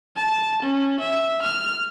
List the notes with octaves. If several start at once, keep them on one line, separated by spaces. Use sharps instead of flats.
A5
C#4
E5
F6